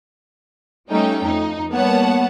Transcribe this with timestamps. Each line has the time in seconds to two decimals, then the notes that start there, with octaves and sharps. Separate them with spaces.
0.89 G3 A3 C#4 D#4 G5
1.24 F2 D#4
1.74 G3 A#3 B3 C#5 F#5 A5